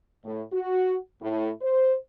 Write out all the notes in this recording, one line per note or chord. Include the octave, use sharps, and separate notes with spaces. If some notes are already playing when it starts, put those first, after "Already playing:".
A2
F#4
A2
C5